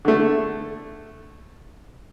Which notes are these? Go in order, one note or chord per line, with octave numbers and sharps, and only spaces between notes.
D3 A3